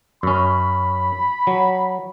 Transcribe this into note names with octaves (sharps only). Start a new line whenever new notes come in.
F#2 C#4 B5
F#3